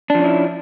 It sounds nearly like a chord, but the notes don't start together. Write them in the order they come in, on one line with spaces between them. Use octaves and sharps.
D4 F3 C#4 E4